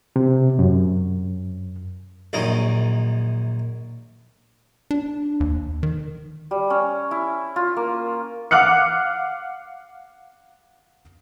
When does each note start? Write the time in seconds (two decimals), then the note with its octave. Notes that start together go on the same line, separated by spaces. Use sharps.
0.16 C3
0.59 F#2
2.33 A#1 F#2 D#3 D#5
4.91 D4
5.40 D#2
5.83 D#3
6.51 G3
6.70 C#4
7.11 E4
7.56 F4
7.76 A#3
8.51 F5 F#5 D6 F6 F#6 C#7